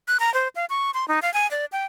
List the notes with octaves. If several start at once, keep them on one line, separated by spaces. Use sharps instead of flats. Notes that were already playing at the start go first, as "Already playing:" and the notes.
F#6
A#5
C5
F5
C#6
C6
D#4
F5
G#5
D5
G5